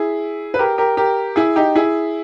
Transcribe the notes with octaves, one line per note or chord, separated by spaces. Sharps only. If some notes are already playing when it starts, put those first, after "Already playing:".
Already playing: E4 G#4
B4
G4 A#4
G4 A#4
G4 A#4
E4 G#4
D#4 G4
E4 G#4